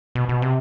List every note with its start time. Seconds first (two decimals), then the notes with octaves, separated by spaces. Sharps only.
0.15 B2
0.29 B2
0.42 C3